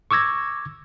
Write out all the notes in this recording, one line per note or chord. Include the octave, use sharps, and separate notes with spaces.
C#6 D6 E6 G#6 A#6